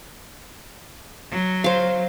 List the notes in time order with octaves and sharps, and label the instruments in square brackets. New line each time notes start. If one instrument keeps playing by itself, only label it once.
[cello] F#3
[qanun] C5 F5